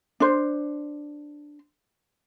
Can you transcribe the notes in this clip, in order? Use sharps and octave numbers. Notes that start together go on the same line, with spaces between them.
D4 C5